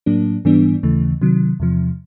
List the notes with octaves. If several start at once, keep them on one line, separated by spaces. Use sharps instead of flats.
A2 F#3 A#3 D4
G#2 E3 G3 B3 D4
D#2 C#3 E3 A3
C3 D#3 F#3
E2 C3 F3